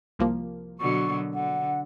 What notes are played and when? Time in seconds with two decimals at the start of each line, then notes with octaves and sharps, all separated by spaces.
0.19 C2 F3 A#3
0.79 B2 D3 F#3 C#6
1.35 D3 F#5